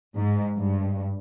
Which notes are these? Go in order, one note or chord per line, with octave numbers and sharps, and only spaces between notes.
G#2
G2